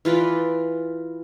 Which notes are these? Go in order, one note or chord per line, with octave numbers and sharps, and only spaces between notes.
E3 F4 B4 D5